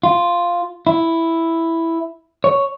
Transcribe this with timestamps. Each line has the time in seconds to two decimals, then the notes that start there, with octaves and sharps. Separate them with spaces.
0.03 F4
0.87 E4
2.44 C#5